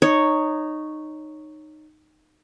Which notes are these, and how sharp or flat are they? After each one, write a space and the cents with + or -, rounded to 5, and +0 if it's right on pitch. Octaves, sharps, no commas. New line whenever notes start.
D#4 -15 C#5 +0